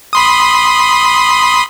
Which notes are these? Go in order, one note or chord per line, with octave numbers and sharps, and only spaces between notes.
B5 C6 D#6